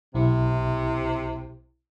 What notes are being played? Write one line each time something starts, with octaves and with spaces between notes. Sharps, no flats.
B1 C3 E4